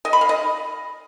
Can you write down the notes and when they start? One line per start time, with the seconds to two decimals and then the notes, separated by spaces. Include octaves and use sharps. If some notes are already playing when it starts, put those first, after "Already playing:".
0.05 D#5
0.13 B5
0.21 F5
0.29 D#5